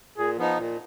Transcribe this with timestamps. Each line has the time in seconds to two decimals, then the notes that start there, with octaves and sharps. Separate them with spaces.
0.17 A#2 G#4
0.38 F3 B3 D#4
0.57 A#2